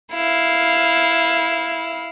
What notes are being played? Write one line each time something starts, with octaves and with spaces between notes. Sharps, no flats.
E4 F5